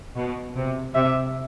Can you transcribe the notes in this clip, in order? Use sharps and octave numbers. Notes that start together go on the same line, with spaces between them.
B2
C3
C3 E5